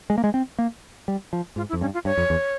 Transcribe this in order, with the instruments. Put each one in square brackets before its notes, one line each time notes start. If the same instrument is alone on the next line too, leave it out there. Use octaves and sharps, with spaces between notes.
[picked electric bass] G#3
A#3
G#3
C4
A#3
G3
F3
[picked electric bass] G#2 [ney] F4
[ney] E4
[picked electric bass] F2
[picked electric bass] G2 [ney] C#4
[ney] F4
[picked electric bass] G2 [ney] C#5
[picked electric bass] F2
E2